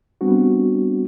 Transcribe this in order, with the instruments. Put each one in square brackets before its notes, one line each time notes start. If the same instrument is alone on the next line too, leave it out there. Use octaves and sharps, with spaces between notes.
[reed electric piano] G3 B3 C4 D4 F#4